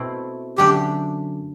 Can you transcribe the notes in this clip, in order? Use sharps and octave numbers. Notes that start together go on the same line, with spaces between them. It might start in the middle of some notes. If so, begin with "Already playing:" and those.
Already playing: B2 A3 C4 E4
F#2 D3 A3 D4 G4